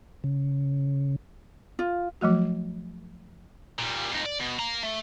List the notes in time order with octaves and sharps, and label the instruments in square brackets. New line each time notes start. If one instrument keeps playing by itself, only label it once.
[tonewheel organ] C#3
[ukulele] F4
[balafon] F3 F#3 A3 F#4
[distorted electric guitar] A#2 G3
F2 D#4
D5
B2
F5 A#5
A3